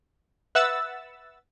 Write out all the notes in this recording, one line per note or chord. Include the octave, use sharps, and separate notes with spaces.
B4 E5 F#5 E6 A6